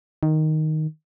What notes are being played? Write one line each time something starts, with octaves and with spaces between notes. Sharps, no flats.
D#3